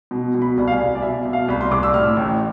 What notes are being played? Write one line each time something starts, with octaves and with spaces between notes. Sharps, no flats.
B2
B2
B5
C2
F5
G#5
C2
D5
B2 E5
B2
F5
C2 B5
C6
C2 D6
E6
A2 F6
A1